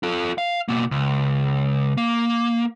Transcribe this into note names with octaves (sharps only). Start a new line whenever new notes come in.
F4 A4
F5
B2 A#3
C#2
A#3